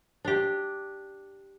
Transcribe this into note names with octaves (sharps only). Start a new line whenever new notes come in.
D4 G4